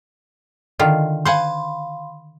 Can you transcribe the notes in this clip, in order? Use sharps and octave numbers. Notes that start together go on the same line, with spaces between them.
D3 D#3 F4
C5 F5 F#5 G#5 B5 C6